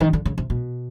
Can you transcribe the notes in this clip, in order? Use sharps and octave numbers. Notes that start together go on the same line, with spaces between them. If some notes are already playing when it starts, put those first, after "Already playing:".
D#3
D3
C#3
C3
B2